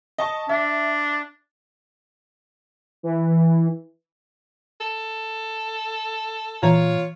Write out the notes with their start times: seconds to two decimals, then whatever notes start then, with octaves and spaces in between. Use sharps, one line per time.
0.18 D#5 A5 C#6
0.49 D4 E5
3.03 E3
4.81 A4
6.63 A#2 E3 F4 C#5 A#5